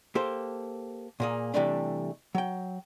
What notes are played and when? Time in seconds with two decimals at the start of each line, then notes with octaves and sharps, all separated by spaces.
0.15 A#3 G4 A4 C5
1.20 A#2 A#3 G#4
1.54 C3 E3 G3 A3 D4
2.35 F#3 G5